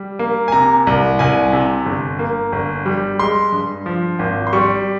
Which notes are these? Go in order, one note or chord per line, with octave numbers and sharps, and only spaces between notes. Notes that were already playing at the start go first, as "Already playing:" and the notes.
Already playing: G3
A#3
G#5
C3 A#5
C2
C2 G#5
C3
G1
A#3
G1
G3
G#3 C6
G2
F3
G#1
C6
G3 C#6